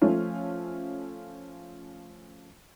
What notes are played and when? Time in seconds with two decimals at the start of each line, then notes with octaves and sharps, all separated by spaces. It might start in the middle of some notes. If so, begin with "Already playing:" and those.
0.02 F3 A3 C#4 F4